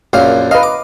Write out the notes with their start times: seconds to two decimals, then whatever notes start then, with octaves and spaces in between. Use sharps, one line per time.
0.13 A#1 F#2 F5
0.51 B4 D#5 F5
0.63 D6